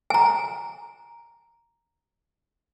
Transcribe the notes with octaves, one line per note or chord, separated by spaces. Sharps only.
G#5 A#5